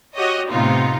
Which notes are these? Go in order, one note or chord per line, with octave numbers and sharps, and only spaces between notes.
F#4 G4 C#5 D#5
A2 C3 B3 D#4 F4